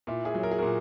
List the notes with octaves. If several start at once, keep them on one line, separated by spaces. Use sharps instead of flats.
A#2 E4
E4 G#4
F#3
A#4
G#4
A#2 F#4 A#4